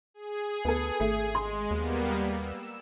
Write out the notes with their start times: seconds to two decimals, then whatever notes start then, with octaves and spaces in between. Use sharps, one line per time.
0.14 G#4
0.65 D2 B3 A4
1.00 G#1 A3
1.35 G#3 C6
1.71 D#2 G3 A#3 B3
2.42 E6